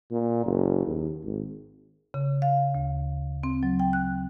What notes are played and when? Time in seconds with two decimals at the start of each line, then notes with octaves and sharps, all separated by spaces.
0.11 A#2
0.44 F#1
0.86 D#2
1.23 G#1
2.14 C#3
2.42 F5
2.75 D2
3.43 C4
3.63 F#3
3.80 G5
3.93 F#6